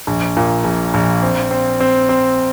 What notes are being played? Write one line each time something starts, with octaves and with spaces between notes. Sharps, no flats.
A#1
A#2
A#1
A#1
C4
C4
C4
C4